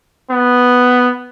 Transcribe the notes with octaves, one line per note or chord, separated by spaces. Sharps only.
B3